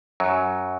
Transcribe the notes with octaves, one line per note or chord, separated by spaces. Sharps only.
F#2 F#3